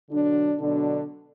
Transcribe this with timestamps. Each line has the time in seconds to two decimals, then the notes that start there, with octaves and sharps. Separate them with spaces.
0.11 B2 D3 F#3 D4
0.59 B2 D3 F#3 D4